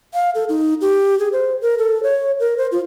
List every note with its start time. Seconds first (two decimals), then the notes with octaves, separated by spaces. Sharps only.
0.14 F5
0.35 A4
0.49 D#4
0.81 G4
1.19 G#4
1.33 C5
1.62 A#4
1.78 A4
2.03 C#5
2.40 A#4
2.58 C5
2.72 F4